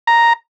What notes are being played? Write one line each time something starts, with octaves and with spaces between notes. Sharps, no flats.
A#5